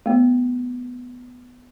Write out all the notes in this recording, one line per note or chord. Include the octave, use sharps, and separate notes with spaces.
A3 B3